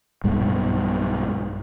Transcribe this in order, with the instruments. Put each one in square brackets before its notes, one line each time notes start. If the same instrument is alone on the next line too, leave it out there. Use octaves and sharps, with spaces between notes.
[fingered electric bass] B1 G2 B2 G#3